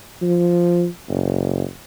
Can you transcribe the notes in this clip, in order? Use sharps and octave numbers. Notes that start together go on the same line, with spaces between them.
F3
F#1